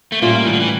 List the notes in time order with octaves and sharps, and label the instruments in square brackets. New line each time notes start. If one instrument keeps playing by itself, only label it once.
[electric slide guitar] A3
[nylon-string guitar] A2 G3 C#4 F4 [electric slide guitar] A#3
[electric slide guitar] E3
D3
E3